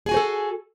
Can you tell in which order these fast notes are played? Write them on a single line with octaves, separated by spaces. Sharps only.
G#4 G#5 F#4 C5 A4